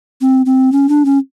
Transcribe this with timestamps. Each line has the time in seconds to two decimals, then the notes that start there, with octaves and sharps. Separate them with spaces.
0.21 C4
0.46 C4
0.72 C#4
0.89 D4
1.05 C#4